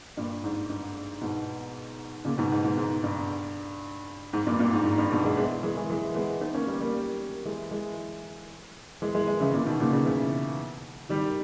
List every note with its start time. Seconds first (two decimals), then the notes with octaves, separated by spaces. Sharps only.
0.17 G2 A#2
0.44 G#2
0.70 G2
1.21 G#2 B2
2.25 A#2 C#3
2.38 G#2 B2
2.52 G#2
2.64 G#2
2.78 G#2
3.03 G2
4.33 G#2
4.47 G2 A#2
4.59 G2 A#2
4.73 G#2
4.85 G#2
4.98 G2
5.11 G#2 B2
5.24 E3 G#3
5.37 G#3 B3
5.63 E3 G#3
5.76 E3 G#3
5.90 E3 G#3
6.15 G#3 B3
6.41 B3 D#4
6.54 A#3 C#4
6.67 G3 A#3
6.80 G3 A#3
7.45 E3 G#3
7.71 E3 G#3
9.02 E3 G#3
9.14 E3 G#3
9.27 E3 G#3
9.41 C#3 E3
9.53 A#2 C#3
9.66 B2 D#3
9.80 A#2 C#3
9.92 A#2 C#3
10.06 C#3 E3
11.09 D#3 G3